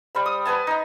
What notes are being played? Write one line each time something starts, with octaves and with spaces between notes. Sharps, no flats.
G3 C5 B5
D#6
B4 F#5 G#5 A5
D#4 A#5